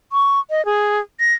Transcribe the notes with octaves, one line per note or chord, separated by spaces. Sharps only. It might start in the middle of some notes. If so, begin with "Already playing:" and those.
C#6
D#5
G#4
A#6